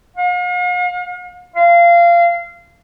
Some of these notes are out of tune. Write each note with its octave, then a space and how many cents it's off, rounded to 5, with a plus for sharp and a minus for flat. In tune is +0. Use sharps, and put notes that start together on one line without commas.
F5 +45
F5 -20